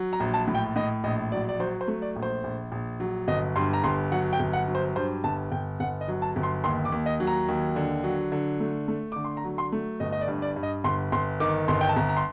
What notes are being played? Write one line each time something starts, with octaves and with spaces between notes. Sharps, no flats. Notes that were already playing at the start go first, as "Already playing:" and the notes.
Already playing: F#3
A#5
A#1
A5
A2
G5
A2 D#5
A#1 D#5
F#3 D5
D5
F#3 C5
C5
A3
D5
A#1
C5
A#1
A#1
F#3
G1 D#5
G2 C6
A#5
G1 C6
F#3 F#5
G5
G1
F#5
F#3
C5
G2 C5
G1 A5
G1 G5
G1 F#5
D#5
F#3
A5
G1
C6
D#2 C6
D6
D#2
D#5
F#3
A#5
D#2
D3
F#3
D3
A3
A3
D3 D6
C6
A#5
F#3
C6
A3
G1 D#5
D#5
D5
G2
D5
G2
D#5
G1 C6
G1 C6
D#3 D6
G1 C6
G5
A5
G1 A#5
A#5
C6